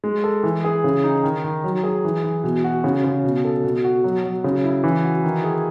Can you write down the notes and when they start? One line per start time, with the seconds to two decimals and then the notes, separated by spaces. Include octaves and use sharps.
0.04 G#3
0.24 A4
0.43 E3
0.64 G#4
0.84 C#3
1.04 D#4
1.24 D#3
1.44 D#3
1.64 F#3
1.84 G#4
2.05 E3
2.24 E3
2.44 B2
2.64 F#4
2.84 C#3
3.04 C#3
3.24 B2
3.44 A4
3.64 B2
3.84 F#4
4.04 F#3
4.24 F#3
4.44 C#3
4.64 E4
4.84 E3
5.04 F#4
5.24 D#3
5.44 G#4